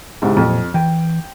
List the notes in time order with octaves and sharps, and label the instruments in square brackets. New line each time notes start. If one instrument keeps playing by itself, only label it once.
[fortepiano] C2 G#2 C#3
[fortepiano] F2 [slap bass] A#2 F3 F#3
[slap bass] E3 [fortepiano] G5